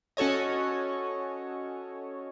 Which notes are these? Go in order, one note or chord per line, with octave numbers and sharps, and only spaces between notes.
C#4 F#4 A4 C#5 D#5